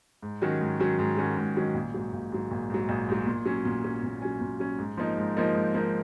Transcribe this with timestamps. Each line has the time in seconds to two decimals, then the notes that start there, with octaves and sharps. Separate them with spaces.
0.23 G#2
0.42 D#3 F#3 C#4 F#4
0.61 G#2
0.80 D#3 F#3 C#4 F#4
0.99 G#2
1.18 D#3 F#3 C#4 F#4
1.37 G#2
1.56 D#3 F#3 C#4 F#4
1.74 A#1
1.94 G#2 F#3
2.13 A#1
2.32 G#2 F#3
2.51 A#1
2.70 G#2 F#3
2.89 A#1
3.09 G#2 F#3
3.27 A#2
3.46 F#3 C#4
3.65 A#2
3.84 F#3 C#4
4.03 A#2
4.22 F#3 C#4
4.41 A#2
4.60 F#3 C#4
4.79 G#2
4.97 F3 A#3 D#4 A#4
5.18 G#2
5.37 F3 A#3 D#4 A#4
5.55 G#2
5.74 F3 A#3 D#4 A#4